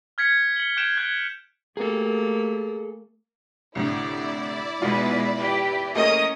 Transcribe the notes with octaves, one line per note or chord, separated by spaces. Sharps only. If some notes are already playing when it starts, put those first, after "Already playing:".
F6 G#6 B6 C#7
C#7 F#7 G7
F#6 G6 C7 D7 E7 F7
F#6 G#6 D7 G7
A3 A#3 G#4 A4
C2 A2 D3 E4 D5
B2 G#3 D#4 F4 B4
G4 B4
A3 A#3 C#4 G#4 A#4 D#5 D#6